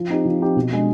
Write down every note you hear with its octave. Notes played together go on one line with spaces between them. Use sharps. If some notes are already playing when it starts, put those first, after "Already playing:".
Already playing: F3
C4 D#4 G4
F3
C4 D#4 G4
B2
G#3 D4